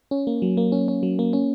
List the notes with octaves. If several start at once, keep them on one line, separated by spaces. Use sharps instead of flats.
C#4
A#3
F#3
A#3
C#4
C#4
F#3
A#3
C#4